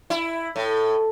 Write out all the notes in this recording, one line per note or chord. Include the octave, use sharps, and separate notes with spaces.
E4
A2